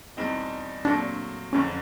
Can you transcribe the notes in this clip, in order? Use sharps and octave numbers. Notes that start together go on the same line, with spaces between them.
E2 B2 G3 C4 D#4
A#2 F#3 A3 C4 D4
F#1 F2 D3 C#4